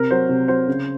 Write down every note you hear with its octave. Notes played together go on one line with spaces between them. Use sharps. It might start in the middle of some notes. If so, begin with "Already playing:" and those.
Already playing: C3 A#4
F#3 C5
C3
F#3 C5
C#3